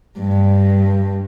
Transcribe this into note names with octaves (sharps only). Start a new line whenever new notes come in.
G2